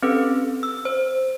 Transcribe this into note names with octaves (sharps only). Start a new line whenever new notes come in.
C4 C#4 G4 A4 B4
E6
C5